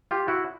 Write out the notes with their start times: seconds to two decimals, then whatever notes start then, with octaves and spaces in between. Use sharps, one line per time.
0.11 F4 G4
0.28 E4 F#4